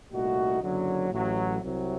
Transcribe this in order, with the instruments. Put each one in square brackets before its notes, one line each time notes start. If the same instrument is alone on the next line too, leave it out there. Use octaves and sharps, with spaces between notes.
[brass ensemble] C2 A#2 A3 D#4 F#4
F#1 F#2 D3 F#3
A1 A2 F#3
C2 C3 F#3